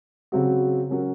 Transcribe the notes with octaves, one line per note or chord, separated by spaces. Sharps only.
C#3 F#3 C4 F#4
F#3 C#4 F#4 A#4